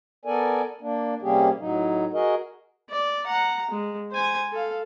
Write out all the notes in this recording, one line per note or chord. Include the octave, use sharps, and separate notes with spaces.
B3 A4 A#4 D5 G#5
A#3 D4
C3 G3 A#3 C#4 G4 G#4
A2 F#3 D#4
F#4 G#4 A#4 D#5
D5
F#5 A#5
G#3
C5 G#5
A4 F5